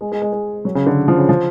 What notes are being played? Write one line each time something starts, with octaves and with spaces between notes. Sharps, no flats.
G#3
G#3
G#3
G#3
F#3
C#3
D3
F3
C#3
F3